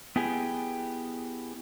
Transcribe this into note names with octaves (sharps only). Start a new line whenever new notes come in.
B3 E4 G4 G#4 G#5